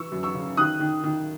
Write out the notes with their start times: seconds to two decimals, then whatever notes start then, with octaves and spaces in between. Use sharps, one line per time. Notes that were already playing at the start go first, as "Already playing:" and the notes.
Already playing: E3 C#6 E6
0.12 F#2
0.23 C#6 E6
0.35 C#3
0.57 D#3 D#6 F#6
0.80 D#3
1.04 D#3